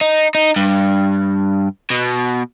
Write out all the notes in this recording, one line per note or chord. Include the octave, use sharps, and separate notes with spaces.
D#4
D#4
G2
B2